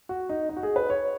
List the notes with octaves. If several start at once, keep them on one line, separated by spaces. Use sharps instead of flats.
F#4
D#4
D#4
F#4
G#4
B4
C#5